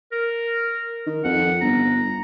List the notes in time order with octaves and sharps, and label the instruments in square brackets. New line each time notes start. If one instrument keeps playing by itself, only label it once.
[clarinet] A#4
[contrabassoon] D#3
[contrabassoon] F2 [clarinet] F#5
[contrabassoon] G1 [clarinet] A#5